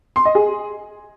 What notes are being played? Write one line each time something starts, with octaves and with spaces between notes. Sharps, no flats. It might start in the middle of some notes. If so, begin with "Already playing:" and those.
C6
D#5
G#4